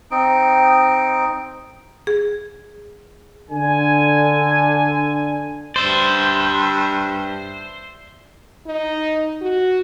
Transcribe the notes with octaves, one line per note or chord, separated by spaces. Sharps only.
C4 D#4 G5
G#4
D3 G#5
G2 C5 D5 E5
D#4
F#4